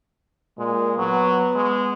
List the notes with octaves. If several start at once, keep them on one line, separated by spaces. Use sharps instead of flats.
A#2 G#3
F#3 B3
G#3